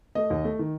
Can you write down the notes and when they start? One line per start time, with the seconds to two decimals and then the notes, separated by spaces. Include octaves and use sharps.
0.15 A3 D#5
0.30 D#2
0.44 A3
0.59 D#3